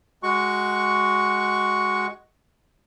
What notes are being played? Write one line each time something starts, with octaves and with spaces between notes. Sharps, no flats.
G#3 F#4 C#6